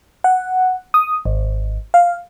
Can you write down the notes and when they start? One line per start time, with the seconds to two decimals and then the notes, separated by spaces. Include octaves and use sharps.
0.24 F#5
0.94 D#6
1.25 G#1
1.94 F5